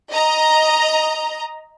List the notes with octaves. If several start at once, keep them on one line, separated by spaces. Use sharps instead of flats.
D#5 A#5